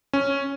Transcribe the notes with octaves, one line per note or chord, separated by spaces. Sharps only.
C#4